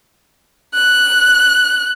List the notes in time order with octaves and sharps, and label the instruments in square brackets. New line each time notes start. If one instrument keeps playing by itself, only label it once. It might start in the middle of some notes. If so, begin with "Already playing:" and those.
[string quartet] F#6